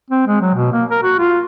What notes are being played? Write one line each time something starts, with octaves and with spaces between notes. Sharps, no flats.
C4
G#3
F#3
B2
A#3
A#4
F#4
F4